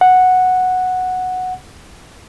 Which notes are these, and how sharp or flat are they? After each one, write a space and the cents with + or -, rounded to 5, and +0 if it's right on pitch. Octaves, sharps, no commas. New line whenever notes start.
F#5 -5